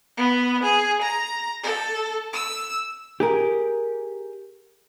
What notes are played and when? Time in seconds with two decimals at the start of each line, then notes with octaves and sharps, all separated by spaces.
0.16 B3
0.62 G#4
1.00 A#5
1.62 A4
2.33 E6
3.20 G4 G#4 A#4